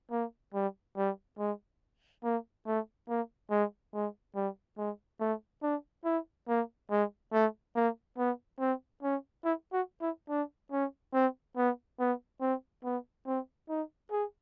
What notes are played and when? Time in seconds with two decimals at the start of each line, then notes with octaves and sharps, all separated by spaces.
0.11 A#3
0.54 G3
0.97 G3
1.39 G#3
2.24 A#3
2.67 A3
3.09 A#3
3.51 G#3
3.94 G#3
4.35 G3
4.78 G#3
5.20 A3
5.62 D4
6.05 E4
6.48 A#3
6.91 G#3
7.33 A3
7.75 A#3
8.18 B3
8.60 C4
9.03 C#4
9.45 E4
9.73 F#4
10.02 E4
10.29 D4
10.72 C#4
11.14 C4
11.57 B3
12.00 B3
12.41 C4
12.84 B3
13.26 C4
13.69 D#4
14.11 G#4